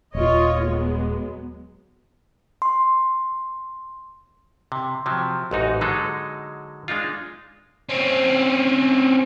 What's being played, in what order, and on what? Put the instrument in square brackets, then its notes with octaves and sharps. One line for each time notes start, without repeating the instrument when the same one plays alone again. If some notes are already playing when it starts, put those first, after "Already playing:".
[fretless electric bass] D#1 [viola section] F4 C#5 D#5
[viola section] F#3 G#3 B3
[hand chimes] C6
[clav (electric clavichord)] C3
C3 F3 F#3
A1 G#2 D#4 F#4
D3 F#3 G#3 D#4 G#4 A4
G#3 D4 D#4 F4
[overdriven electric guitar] C4 C#4